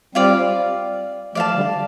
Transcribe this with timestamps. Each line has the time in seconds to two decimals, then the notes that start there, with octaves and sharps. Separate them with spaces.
0.15 G3 C4 F4 D5 F5
1.35 F3 A3 D5 F5 A5
1.55 D3 G3